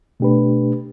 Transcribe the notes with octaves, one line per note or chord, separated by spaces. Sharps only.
B2 A3 D4 G4 B4